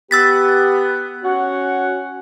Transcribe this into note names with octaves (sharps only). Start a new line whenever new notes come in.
B3 G4 E6 A6 B6
C#4 F#4 F#5